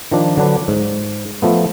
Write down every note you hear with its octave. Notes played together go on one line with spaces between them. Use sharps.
D#3 F3 D4
D3 F#3 D4 B4
G#2
F3 A3 B3